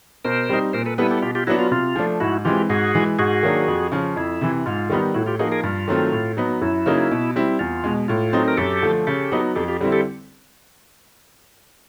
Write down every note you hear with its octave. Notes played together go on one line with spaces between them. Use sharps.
B2 A#4 C5
G3 C4 D#4
A#2 A#4 C5
A4 B4
G3 B3 E4 A4 B4
G4 A4
B2 F4 G4
F4 G4
F#3 B3 D4 E4 F#4
F4
C3 F4
F3 A3 D4
G#2 E4 F#4
E3 G#3 C4 F4 G4
G#2 F#4 G#4
E3 G#3
G#2 F#4 G#4
D#3 F#3 A#3 D4
F2
C#3 F3
F2 E4
C3 E3
G#2 F4
D#3 G3 B3 D#4
A2 E4 F#4
F4 G4
F3 A#3 D#4 F#4 G#4
G#4 A#4
G2 F4
D#3 F#3 A3 C4
A2
F#3 B3 D#4
F#2 E4
C#3 F#3 A#3 D#4
B2
G3 C4 E4
E2 F4
B2 G#3
A2 F4
F#3 A3 C4 D#4
A#4
F#2 G4 A4
D3 F3 A3
C#3 G4 A4
F#3 B3 D#4
F2 G4 A4
F4 G4
D3 G3 C4 E4
G4 A4